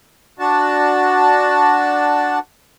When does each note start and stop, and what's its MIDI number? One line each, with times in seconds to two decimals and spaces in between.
0.39 2.39 62
0.39 2.39 66
0.39 2.39 81